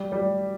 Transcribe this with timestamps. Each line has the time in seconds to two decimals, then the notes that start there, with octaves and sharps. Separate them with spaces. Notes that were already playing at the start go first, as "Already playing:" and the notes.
Already playing: G3
0.12 G3